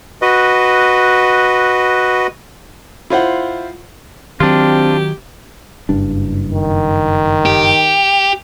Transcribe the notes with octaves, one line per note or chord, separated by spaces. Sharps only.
F#4 B4 D#5
E4 F4 C5 F#5
D#3 F#3 C4 D4 F4 G4
F#1 G2 D4
D#3
G4